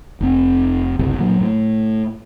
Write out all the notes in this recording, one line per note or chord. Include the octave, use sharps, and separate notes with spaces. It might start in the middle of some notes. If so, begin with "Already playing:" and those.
F1 C4
F#1 C2 C3
A#2 F#3
A2